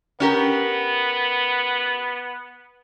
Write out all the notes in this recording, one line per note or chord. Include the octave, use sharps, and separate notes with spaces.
B3 C#4 G4 A#4